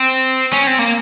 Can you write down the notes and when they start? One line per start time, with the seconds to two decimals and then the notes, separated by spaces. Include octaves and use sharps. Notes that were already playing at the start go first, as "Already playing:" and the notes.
Already playing: C4
0.53 C#4
0.67 C4
0.79 A#3